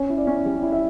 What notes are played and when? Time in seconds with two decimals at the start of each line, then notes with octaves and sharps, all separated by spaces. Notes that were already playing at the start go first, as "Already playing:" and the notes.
Already playing: C#4 C#5
0.09 E4
0.18 D5
0.27 C#4
0.45 G3
0.62 E4
0.72 E5